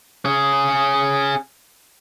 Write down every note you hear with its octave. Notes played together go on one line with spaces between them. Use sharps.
C#4 G#4